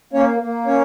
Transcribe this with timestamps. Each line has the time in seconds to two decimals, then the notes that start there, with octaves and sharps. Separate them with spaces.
0.13 A#3 C#4 C#5
0.39 A#3
0.66 C#4 C#5